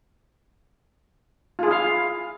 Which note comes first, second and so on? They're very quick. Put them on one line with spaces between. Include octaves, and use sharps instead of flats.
F4 G#4 E4 F5